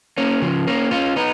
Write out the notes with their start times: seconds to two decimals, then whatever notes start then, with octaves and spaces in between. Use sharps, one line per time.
0.17 A#3 C#4
0.42 C#3 F3
0.67 A#3 C#4
0.91 C#4 F4
1.16 B3 D#4